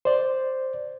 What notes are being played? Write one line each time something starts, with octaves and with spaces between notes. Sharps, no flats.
C5 D5